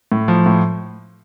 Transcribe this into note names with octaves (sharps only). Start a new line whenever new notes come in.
A2
F3
A2